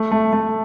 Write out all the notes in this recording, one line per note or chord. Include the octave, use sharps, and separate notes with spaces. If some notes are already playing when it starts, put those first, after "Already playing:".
Already playing: A3
A3
A3